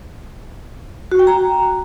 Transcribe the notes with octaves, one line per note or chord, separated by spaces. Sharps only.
F#4
G5
A#5